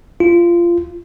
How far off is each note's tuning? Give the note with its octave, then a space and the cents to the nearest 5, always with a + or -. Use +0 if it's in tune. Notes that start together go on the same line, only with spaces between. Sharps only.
F4 -20